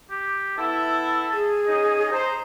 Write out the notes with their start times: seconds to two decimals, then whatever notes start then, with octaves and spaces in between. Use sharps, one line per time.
0.11 G4
0.58 B3 E4 A4
1.33 G#4
1.67 C#4 D#4 D#5
2.12 C5 A#5